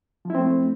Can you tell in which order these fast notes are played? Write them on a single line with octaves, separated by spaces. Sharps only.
F3 E4 C4 A3